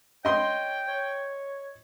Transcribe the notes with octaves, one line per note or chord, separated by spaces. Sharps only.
C#5 D#5 G5 C6
C#5